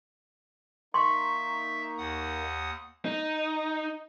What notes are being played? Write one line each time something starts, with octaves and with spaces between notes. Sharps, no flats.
A#3 D#4 E5 C6 C#6
D#2 F#5 D#6
D#4